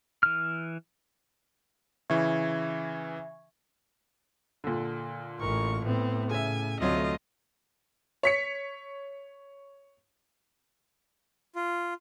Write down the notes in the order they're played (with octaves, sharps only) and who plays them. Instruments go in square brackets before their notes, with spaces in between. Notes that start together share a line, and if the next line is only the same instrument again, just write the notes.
[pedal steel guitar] E3 F6
[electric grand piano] C#3 E3 [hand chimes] E5 C#6 G#6
[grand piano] A#2 D3
[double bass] A1 [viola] A#4 C#6
[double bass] A2 [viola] B3 C4
[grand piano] C#3 E5 [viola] G#5
[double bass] D2 [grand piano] C3 F#3 A3 [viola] F4 D#5
[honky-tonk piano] C#5 B6 C#7
[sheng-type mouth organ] F4